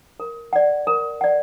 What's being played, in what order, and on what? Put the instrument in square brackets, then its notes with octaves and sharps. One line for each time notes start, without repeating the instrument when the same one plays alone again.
[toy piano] A#4
D5 F#5
A#4
D5 F#5